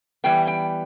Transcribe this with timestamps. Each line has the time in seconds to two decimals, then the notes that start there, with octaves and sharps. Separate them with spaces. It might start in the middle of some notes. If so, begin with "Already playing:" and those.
0.24 E3 G3 B3 G5
0.47 G5